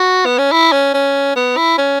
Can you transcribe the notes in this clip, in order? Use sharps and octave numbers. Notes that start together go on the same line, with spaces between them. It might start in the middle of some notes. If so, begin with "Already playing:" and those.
Already playing: F#4
B3
C#4
E4
C#4
C#4
B3
E4
C#4